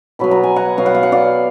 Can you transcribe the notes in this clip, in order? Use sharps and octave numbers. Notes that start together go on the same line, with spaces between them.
B2 F#3 B3 B5
A#5
G#5
F#5 A#5
B2 F#3 B3 F5
F#5
F5
F#5
D5 F5